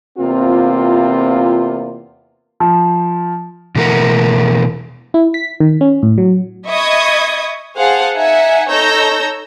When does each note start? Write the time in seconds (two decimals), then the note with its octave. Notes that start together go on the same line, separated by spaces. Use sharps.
0.18 E2 C3 A#3 C4 F4
2.60 F3
3.76 B2 E3 A3 A#4 F#5
5.14 E4
5.34 B6
5.60 D#3
5.81 C#4
6.03 A2
6.18 F#3
6.67 D#5 E5 B5 C#6 D#6 G#6
7.77 G#4 C5 F5 F#5 A5
8.16 D#4 E5 F#5 G#5
8.70 D#4 A4 C#5 E6 G6 A#6